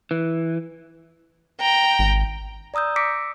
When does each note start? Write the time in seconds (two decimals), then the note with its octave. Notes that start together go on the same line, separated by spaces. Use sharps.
0.11 E3
1.60 G5 A#5
1.99 G#1
2.74 D5 A#5 D#6 E6 G6
2.96 D6 E6 A#6 B6 C#7 D7